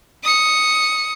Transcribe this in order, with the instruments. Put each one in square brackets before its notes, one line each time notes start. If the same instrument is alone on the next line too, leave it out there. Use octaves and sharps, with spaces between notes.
[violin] D#6 C#7